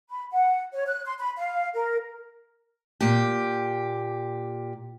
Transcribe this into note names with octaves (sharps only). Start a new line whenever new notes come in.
B5
F#5
C#5
F#6
C6
B5
F5
A#4
A#2 G4